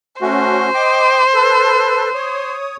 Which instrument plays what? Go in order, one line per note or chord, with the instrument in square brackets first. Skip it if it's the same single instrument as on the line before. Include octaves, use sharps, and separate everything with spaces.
[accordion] A3 C#4 F#4 [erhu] C5
[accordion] D#5 G5 D6
A4 B4
C#5 D#6